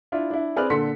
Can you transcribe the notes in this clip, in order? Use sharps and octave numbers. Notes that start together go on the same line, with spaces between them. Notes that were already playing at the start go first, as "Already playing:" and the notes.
D4 E4 F4
D4 E4
C4 G#4 B4 D5 F6
A#2 D3 A4 C6 B6 C#7